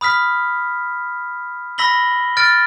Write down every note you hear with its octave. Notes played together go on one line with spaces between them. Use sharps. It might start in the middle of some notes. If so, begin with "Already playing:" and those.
B5 D#6 F6 B6
B5 E6 A#6 B6 F#7 G7
F6 A6 D7